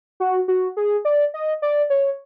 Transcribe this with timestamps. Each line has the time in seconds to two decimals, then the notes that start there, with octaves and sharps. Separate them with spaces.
0.20 F#4
0.48 F#4
0.77 G#4
1.05 D5
1.34 D#5
1.62 D5
1.90 C#5